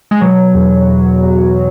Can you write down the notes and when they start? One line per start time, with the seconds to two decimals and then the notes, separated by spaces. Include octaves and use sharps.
0.11 G#3
0.21 B2 F#3
0.54 E2
0.88 E2
1.23 E2